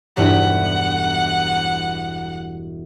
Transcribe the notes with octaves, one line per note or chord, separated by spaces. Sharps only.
E1 G2 E4 F#5